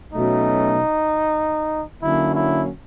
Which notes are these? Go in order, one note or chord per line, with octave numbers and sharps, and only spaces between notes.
B2 F#3 A3 C#4 D#4
D3 F#3 A#3 C#4 E4
E4